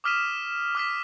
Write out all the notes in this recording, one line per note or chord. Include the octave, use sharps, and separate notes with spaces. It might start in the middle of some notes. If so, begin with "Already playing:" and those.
D6 D#6 F6 B6 D#7 E7
D6 F6 B6